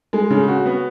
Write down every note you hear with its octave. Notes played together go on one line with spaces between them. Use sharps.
G#3
C#3
F#4
B3